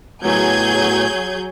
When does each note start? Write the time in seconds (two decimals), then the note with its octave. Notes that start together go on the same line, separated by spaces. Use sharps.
0.25 A2 F#3 B3 G#4 G6 G#6